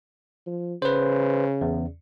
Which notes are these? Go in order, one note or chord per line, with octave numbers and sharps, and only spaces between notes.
F3
C#3 B4 C5
E2